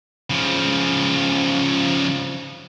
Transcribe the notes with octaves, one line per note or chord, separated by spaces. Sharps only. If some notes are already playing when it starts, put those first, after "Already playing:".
C#3 F3